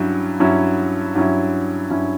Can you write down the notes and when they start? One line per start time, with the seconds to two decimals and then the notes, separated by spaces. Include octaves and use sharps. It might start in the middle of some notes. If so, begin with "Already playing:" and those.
Already playing: G2 F#3 C#4 E4
0.40 G2 F#3 C#4 E4
1.15 G2 F#3 C#4 E4
1.90 G2 F#3 C#4 E4